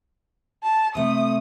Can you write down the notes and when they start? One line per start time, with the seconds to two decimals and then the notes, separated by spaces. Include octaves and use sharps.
0.63 A5
0.95 C3 A3 D#6